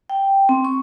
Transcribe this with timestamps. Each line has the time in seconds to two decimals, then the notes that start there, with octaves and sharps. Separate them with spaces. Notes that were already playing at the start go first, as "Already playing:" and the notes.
0.10 G5
0.49 C4
0.65 C#6